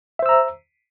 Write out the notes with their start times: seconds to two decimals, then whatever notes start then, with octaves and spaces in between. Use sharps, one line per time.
0.19 E5
0.22 C5
0.26 E6
0.29 A#5